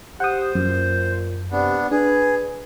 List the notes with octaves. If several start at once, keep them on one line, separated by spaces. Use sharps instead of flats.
G4 C5 F#5 D#6
F#2 A#2
C3 B3 D4
D4 G#4 B4